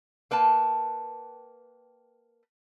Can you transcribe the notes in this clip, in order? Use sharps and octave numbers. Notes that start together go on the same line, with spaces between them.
A#3 B4 G5 A5